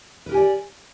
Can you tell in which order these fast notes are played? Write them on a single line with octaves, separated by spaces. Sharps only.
B4 A#4 G4 G#5 D5